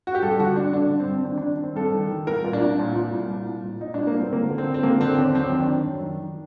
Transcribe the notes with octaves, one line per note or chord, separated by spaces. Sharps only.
F#4
G4
G2 A4
D3 F#4
G2 D4
D3 D4
G2
C4
G2
C4
D#3 D4
D#3 D4
D#3 C4
G2 A4
D#3
D#3
C2 A#4
A#2
D4
C2
A#2
A#2
C2
A#2
C2
A#2
A#2 D#4
C2 D4
A#3
C2 C4
D3 A#3
D3
C4
D3
C4
D3 A#3
D3 C4
D#2
F#2 C4
D#3
D4
D#3
F#2
D#3
D#3